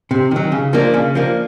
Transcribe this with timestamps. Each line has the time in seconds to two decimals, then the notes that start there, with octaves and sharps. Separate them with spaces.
0.11 C3
0.31 D#3 F#3
0.52 C#3
0.73 F3 A#3 D4
0.94 C#3
1.15 F3 A#3 D4